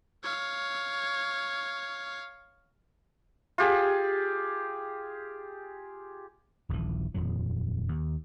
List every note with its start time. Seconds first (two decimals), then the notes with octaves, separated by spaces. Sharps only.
0.23 C#5 F5
3.58 F4 G4 G#4
6.69 D#1 A#1 B2 E3
7.14 D#1 F2 A#2 F#3
7.89 D#2